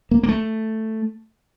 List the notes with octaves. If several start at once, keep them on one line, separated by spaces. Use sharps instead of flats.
A#3
A#3
A3